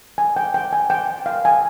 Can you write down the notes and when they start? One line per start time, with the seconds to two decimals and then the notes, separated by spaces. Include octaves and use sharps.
0.18 G#5
0.36 G5
0.54 G5
0.73 G#5
0.90 G5
1.26 F5
1.45 G#5